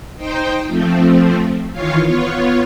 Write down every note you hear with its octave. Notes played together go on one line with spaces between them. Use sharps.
D#4 C5 G5
F3 A3 C4
D#3 E3 F4 C#5 F5
B3 F4 C#5